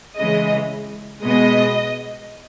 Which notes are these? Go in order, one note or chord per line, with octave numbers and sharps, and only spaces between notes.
C#3 E3 G#3 D#5
B2 G#3 B3 D#5